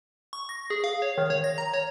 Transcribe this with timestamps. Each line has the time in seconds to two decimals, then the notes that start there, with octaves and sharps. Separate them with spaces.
0.33 C#6
0.49 A#6
0.70 G#4
0.84 F5
1.02 C#5
1.18 D#3
1.30 C#5
1.44 A#6
1.58 A#5
1.74 C#5